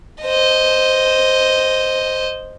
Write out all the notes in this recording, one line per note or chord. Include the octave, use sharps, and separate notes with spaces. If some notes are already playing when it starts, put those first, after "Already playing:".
C5 D#5